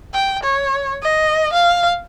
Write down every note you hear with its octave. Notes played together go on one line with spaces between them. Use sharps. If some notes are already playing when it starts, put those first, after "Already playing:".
G5
C#5
D#5
F5